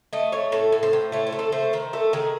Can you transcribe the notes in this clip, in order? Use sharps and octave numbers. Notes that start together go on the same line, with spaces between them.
A3 D#5
A3 C#5
A2 A4
A2
C5
A2
A3 C#5
C5
A3
A4
A3 C5
D#3 C5
A3 A4
D#3 G#4